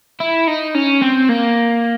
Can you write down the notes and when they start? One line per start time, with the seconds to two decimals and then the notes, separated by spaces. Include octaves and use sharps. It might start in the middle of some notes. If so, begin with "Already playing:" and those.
0.20 E4
0.47 D#4
0.75 C#4
1.01 C4
1.29 A#3